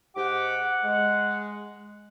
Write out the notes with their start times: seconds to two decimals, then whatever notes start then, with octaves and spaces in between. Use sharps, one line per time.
0.16 G#2 G4 F#5 D6
0.84 G#3